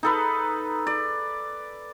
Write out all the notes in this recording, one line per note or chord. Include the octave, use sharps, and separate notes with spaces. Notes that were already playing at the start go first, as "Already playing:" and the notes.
D#4 A4 B4
D5